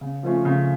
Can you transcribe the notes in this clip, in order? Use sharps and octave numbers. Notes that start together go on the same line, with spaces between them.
C#3
F3 A3 C#4 F4
C#3